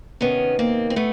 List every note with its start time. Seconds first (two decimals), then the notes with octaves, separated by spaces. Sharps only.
0.21 C3 D#3 B3 C#4
0.59 A#3 C4
0.90 C4
0.96 C3 A3 B3